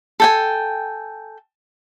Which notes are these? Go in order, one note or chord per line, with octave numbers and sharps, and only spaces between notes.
A4 G5 G#5